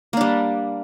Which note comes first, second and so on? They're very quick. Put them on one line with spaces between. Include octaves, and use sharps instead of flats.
A#3 D4 G3